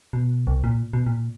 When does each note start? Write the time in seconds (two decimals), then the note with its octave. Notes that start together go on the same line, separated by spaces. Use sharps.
0.13 B2
0.47 C2
0.64 A#2
0.93 B2
1.06 A#2